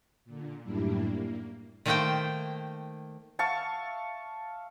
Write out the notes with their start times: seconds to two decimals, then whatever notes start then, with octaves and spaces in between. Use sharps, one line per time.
0.25 A#2 D3
0.63 F#2 A2 G3 A#3 D4 E4
1.04 A#3
1.86 D#3 A3 A#3 C5 E5 G5
3.39 E5 F5 A5 C#6